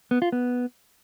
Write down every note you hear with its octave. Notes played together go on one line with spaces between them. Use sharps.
B3
F4
B3